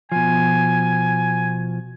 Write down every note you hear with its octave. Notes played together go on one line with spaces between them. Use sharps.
B2 F3 G#5